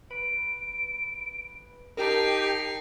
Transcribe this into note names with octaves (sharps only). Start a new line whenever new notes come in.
B4 D7
D#4 G4 A#4 G5 A5 C7 D7